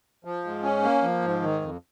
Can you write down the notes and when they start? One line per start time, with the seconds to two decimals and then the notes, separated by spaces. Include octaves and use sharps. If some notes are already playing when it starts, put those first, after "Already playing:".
0.25 F3
0.44 G#2
0.63 C#4
0.83 A#3
1.02 F3
1.22 G#2
1.42 D#3
1.61 F2